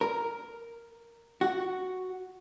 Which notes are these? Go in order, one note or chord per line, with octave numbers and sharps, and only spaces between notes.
A#4
F#4